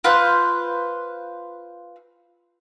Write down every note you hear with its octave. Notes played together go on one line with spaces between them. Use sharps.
F4 B4 C5 F#6